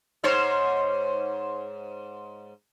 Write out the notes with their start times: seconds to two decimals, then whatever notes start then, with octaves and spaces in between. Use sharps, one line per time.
0.24 G#2 C5 C#5